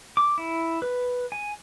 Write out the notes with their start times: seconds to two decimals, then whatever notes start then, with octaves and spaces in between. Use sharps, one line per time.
0.17 D6
0.38 E4
0.82 B4
1.32 G#5